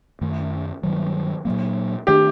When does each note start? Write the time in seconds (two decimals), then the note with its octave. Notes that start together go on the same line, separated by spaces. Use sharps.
0.21 F#2 D#3 A3
0.83 G2 D#3 F#3
1.45 A#2 F#3 A#3
2.07 D#3 A3 D4 G4